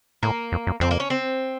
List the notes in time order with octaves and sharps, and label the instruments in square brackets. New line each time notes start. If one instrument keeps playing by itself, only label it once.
[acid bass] A2 [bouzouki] A#3
[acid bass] F2
F#2
[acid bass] F2 [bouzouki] C4
[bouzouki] A#3
C#4
C4